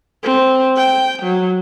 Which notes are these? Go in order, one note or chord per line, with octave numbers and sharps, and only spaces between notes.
C4
G5
F#3